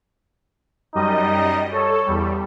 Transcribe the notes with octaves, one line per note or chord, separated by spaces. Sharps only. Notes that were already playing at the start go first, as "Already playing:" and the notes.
F#2 G3 D#4 D#5
A4 C#5
E2 G3